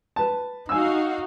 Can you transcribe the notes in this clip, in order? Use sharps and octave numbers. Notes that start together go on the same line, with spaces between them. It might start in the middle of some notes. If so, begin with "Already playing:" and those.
B4 A5
D#4 F#4 F5 G#5 E6